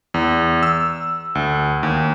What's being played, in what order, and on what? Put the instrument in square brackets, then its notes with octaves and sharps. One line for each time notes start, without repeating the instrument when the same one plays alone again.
[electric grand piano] E2
E6
D2
D#2